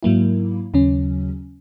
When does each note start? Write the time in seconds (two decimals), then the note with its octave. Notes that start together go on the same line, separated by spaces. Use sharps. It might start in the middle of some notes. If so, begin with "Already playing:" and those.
0.03 G#2 F#3 A#3 E4
0.74 D#2 C#3 F#3 C#4